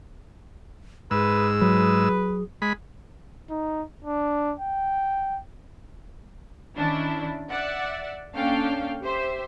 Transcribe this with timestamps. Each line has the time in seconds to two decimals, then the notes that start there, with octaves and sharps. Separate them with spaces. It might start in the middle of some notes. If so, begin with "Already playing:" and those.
1.11 G#2 G#4 B4 E6
1.62 F#3 B4
2.62 G#3 B5
3.50 D#4
4.04 D4
4.59 G5
6.76 D#3 C#4 D4 E4
7.50 D5 E5 F#5
8.35 A#3 C#4 D4 A4 F5 G5
9.01 G4 C5 E5